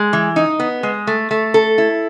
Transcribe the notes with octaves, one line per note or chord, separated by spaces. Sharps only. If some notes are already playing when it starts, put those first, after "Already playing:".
Already playing: G#3
E3
D#4
B3
G#3
A3
A3
A4
E4